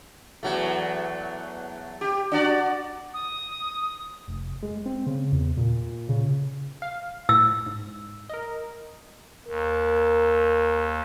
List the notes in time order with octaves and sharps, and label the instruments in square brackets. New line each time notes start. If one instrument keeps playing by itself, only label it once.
[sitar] E2 F#3 A3
G4
D4 F#4 D5
[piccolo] D#6
[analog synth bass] F1
G#3
C4
C#3
E2
A#2
C#3
[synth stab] F5
[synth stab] A2 [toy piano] E6
[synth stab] G#2
A#4 D#5
[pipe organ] D#2 [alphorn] A#4